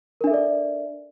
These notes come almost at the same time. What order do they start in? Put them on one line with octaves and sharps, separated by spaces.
A#4 D4 E5 A4 D5